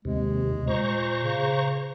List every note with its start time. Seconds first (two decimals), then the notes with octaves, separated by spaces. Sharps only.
0.05 D#2 C3 G#3
0.67 A#2 C5 A#5 C#6
1.23 C#3